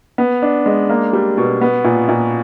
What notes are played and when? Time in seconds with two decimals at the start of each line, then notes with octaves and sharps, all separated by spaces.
0.18 B3
0.42 D4
0.66 G#3
0.89 A#3
1.13 G3
1.38 B2
1.61 B3
1.84 A#2
2.09 A#2